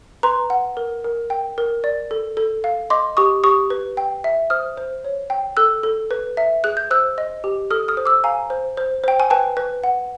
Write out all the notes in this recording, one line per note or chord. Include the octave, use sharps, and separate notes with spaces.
B4 A#5 C6
F#5
A#4
A#4
G5
A#4
D5
A4
A4
F5
D#5 C6 D6
G4 C#6 D#6
G4 C#6 D#6
B4
G5
E5
C5 D#6 F6
C5
C#5
G5
A4 E6 F#6
A4
B4
E5
G#4 F#6
G6
C5 E6 F#6
D#5
G4
A4 D#6 F6
D#6 F6
C5
D6 E6
F5 G#5 A#5
C5
C5
C5 G5
G#5
B4 G5 A5
B4
F#5